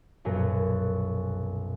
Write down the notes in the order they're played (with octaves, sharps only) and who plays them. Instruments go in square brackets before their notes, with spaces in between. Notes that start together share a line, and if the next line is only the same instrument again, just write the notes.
[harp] F1 B1 F#2 A#2 G#5 A#6